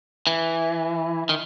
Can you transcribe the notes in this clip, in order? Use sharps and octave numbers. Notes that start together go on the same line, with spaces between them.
E3
D#3